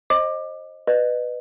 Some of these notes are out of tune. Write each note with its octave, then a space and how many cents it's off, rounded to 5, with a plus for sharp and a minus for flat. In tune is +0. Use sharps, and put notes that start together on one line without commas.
C5 +25 D#5 +0 D6 +20
B4 +0 D#5 -35